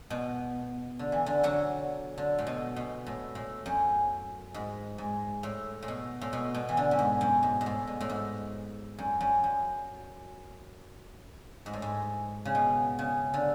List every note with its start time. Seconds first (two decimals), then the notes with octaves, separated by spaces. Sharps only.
0.10 B2
0.99 D3
1.12 E3
1.26 D3
1.43 D3 F#3
2.18 D3
2.38 A2
2.47 B2
2.76 B2
3.06 A2
3.35 A2
3.66 F#2
4.54 G#2
4.98 G#2
5.43 A2
5.82 A2
5.88 B2
6.21 A2
6.33 B2
6.55 B2
6.69 E3
6.77 D3
6.91 F#2
6.99 G#2
7.21 F#2
7.43 G#2
7.61 G#2
7.66 A2
7.87 B2
8.01 A2
8.09 G#2
8.98 F#2
9.21 F#2
9.44 F#2
11.66 G#2
11.73 A2
11.82 G#2
12.45 C#3
12.55 B2
12.99 C#3
13.34 D3